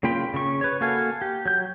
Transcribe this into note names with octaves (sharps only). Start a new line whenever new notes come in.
C#3 A#3 F4 G5 B5
C#3 C#6
B4 C#5
A#3 F#4 A4 F5 G#5
G4
F#3 G6